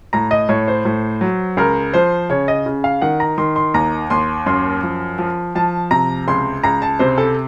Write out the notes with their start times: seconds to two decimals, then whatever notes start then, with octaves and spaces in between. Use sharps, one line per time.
0.13 A2 A#5
0.31 D#5
0.49 A2 C#5
0.68 C5
0.85 A2
1.21 F#3
1.57 C#2 A#4
1.94 F3 C5
2.29 C#3 C#5
2.48 D#5
2.66 C#3
2.84 F5
3.02 D#3 F#5
3.20 A#5
3.38 D#3 C6
3.56 C6
3.74 D#2 A#5
4.10 D#2 C6
4.46 F#2 C6
4.83 F3
5.19 F3
5.55 F3 A5
5.91 C3 A#5
6.28 C#2 C6
6.63 C#2 A#5
6.82 A5
6.99 C3 C5
7.18 A4